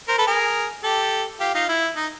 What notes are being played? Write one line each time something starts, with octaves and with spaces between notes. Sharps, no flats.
A#4 C5
A4 B4
G#4 A#4
G4 A4
F4 G4
D#4 F4
E4
D#4